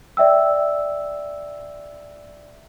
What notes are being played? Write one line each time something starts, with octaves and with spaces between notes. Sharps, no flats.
D5 E5 G5 E6